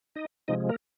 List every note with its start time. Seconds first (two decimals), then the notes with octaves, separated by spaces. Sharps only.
0.16 D#4 D#5
0.48 C3 F3 G#3 D#4 D#5
0.69 A#3 A#4